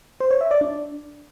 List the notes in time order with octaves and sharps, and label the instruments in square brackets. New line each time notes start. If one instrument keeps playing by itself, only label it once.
[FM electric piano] C5
C#5
E5
D5
D4